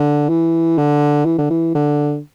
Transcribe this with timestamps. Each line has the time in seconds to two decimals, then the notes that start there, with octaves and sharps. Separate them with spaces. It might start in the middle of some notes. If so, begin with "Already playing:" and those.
Already playing: D3
0.29 E3
0.78 D3
1.25 E3
1.38 D3
1.50 E3
1.75 D3